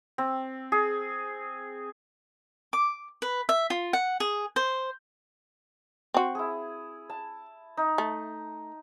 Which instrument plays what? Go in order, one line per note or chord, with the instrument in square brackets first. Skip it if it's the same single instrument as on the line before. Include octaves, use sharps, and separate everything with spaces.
[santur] C4
G#4
[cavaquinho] D6
B4
E5
F4
F#5
G#4
C5
[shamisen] C4 F#4
[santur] E4 G#4
A5
D#4
[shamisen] A3